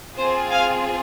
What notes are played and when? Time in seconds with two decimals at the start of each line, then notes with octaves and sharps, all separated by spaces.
0.17 C4 F4 G#4 C5
0.51 F5 G#5